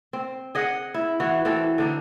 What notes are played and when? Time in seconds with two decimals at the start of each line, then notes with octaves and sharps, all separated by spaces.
0.13 C4
0.55 G#4 D#5 F#5
0.94 E4
1.20 E3 F#4
1.45 E3 C4 A4 D5
1.78 D3 D4 D#4